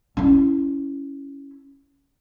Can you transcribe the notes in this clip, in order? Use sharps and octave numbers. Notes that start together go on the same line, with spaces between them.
C#4 E4